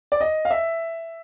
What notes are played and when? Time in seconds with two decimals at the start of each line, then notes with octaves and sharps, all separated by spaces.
0.12 D5
0.21 D#5
0.45 F5
0.51 E5